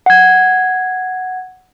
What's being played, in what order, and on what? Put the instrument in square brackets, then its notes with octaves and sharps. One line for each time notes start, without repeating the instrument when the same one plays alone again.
[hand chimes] F#5 G#6